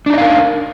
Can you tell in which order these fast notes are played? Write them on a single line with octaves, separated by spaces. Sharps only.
D4 D#4 D#5 F5 A#4